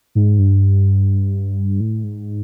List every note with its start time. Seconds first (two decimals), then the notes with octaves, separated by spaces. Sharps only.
0.15 G#2
0.39 G2
1.80 A2
2.04 G#2